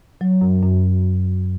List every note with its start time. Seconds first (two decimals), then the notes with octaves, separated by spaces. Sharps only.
0.21 F#3
0.41 F#2
0.63 F#2